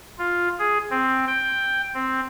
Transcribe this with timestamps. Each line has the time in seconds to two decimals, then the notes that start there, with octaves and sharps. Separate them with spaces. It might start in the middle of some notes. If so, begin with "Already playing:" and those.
0.19 F4
0.59 G#4
0.90 C4
1.27 G5
1.94 C4